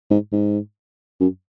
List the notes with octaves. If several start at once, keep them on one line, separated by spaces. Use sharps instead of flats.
G#2
G#2
F#2